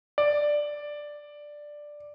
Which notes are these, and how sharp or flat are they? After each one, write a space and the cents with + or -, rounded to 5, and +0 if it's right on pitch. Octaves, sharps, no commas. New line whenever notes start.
D5 +5